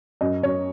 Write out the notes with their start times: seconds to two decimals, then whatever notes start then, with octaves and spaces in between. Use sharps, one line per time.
0.21 F#2 D#5
0.43 F#2 C#5